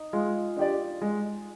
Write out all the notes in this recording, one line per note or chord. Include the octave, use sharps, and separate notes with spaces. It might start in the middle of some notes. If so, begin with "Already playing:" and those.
Already playing: D#4
G#3 F4
D4 G4 D5
G#3